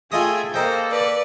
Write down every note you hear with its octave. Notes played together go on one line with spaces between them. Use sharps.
A3 F4 G#4 D#5 G5 G#5 D#6
A#3 A4 A#4 C5 D#5 G5
B4 D5